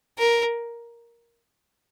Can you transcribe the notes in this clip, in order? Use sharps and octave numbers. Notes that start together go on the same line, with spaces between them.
A#4